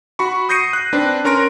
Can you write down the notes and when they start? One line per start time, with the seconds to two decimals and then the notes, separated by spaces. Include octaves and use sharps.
0.19 F#4 B5 C#6
0.49 D#6 G6 A#6 C7 C#7 D#7
0.73 F#6
0.93 C4 D4 B4
1.25 C#4 A#4 C6 A#6 D7